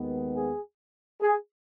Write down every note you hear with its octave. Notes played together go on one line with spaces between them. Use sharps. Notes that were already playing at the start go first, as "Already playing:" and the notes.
Already playing: D#2 D#3 G#3 B3
G#4
G#4